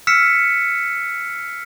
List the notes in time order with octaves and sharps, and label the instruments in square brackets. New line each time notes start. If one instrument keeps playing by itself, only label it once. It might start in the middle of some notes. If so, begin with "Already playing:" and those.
[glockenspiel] E6 F6 B6 C#7 E7